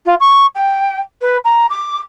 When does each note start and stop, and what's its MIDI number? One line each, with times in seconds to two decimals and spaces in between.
0.05 0.14 65
0.20 0.46 85
0.55 0.99 79
1.21 1.37 71
1.44 1.66 82
1.69 1.98 86